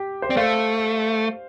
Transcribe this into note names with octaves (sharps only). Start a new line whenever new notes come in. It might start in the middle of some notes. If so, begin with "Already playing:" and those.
Already playing: G4
C5
C4 D5
A3 C5 F5